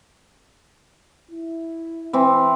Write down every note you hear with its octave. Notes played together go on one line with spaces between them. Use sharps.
E4
E3 C4